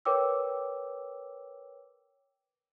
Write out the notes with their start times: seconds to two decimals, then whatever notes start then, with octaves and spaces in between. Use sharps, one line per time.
0.05 A#4 B4 C#5 G5 D6 E6